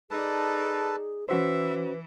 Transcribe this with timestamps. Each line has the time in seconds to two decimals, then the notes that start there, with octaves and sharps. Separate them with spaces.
0.11 D#4 G#4 A4 B4 D5 A5
1.29 E3 C#4 F#4 B4 C5 E5